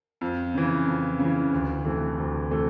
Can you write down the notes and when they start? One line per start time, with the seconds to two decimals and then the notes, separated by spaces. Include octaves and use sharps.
0.21 F2
0.54 C#3 E3
0.86 F2
1.19 C#3
1.25 E3
1.52 D2
1.85 C3 E3 A3
2.18 D2
2.51 C3 E3 A3